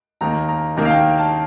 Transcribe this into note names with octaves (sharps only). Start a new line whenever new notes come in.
D#2 D#3 A#3 A#5
A#5
D#2 D#3 A#3 A#5
F5
G5
A5